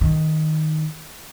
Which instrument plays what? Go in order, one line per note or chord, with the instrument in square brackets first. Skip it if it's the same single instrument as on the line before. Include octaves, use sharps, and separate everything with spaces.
[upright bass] D#3